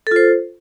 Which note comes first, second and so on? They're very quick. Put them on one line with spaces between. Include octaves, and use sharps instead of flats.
A4 F4 C5